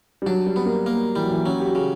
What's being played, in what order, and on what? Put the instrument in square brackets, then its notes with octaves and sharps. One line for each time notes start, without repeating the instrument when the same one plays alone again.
[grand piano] G3
[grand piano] F#3 [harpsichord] D4
[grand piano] G3
[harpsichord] B3
[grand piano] A#3
[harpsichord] A#3
[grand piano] E3 [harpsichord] G3
[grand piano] F#3
E3
[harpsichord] F#3 [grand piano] C#4
[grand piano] G4
F#4
[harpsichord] C#3